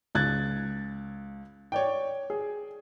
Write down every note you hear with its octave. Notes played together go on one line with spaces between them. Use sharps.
C#2 F#6 G#6 A6
C#5 D5 G5
G#4